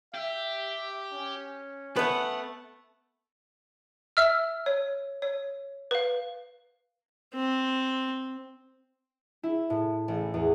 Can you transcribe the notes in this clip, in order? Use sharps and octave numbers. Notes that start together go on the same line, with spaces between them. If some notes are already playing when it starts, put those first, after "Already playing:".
G4 E5
C#4
A3 B3 B4 F#5
E5 E6 F6
C#5
C#5
B4 F5
C4
E4
A2
A1
E2